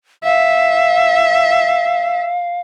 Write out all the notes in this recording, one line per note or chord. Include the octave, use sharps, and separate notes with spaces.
E5 F5